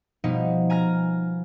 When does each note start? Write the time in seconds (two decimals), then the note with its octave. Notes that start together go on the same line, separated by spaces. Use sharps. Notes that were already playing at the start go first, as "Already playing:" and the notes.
0.24 B2 F3 G3 B3 D#4
0.70 G#5 A#5 F6 A#6